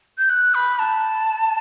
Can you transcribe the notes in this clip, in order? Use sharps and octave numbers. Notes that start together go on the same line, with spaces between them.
G6
F#6
B5
A5